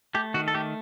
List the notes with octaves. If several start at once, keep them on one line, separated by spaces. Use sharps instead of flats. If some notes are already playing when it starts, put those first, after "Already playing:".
A3 G4
D#3 F#4
A4
A3 G4